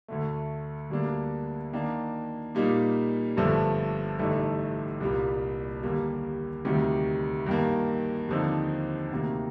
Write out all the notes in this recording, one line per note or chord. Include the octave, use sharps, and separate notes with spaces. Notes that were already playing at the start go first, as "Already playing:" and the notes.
D2 D3 A3
D2 D3 G3 A#3 D4
D#3 A#3 D4
A#2 G3 A#3 D#4
G1 G2 D3 F3 A3
A1 G2 D3 A3 D#4
C2 A#2 G3 A#3
D#2 D3 G3 A#3
D2 C3 D#3 G3
G2 D#3 A#3
D#2 D3 F3 C4 D#4
D2 C3 D#3 A#3